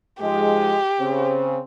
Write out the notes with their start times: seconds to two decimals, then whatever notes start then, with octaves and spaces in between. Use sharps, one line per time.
0.21 G#2 F3 G#3 G4
1.00 C#3 C4